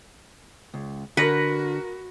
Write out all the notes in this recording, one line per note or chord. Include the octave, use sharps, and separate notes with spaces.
C#2
D3 F#4 A#4 B4 A#6 C#7